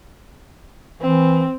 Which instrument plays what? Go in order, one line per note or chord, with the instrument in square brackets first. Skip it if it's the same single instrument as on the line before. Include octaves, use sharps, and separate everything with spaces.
[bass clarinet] E3 [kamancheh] C4